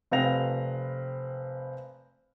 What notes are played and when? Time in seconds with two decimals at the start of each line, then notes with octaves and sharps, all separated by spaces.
0.11 F1 C4 B4 F5 A#6 F7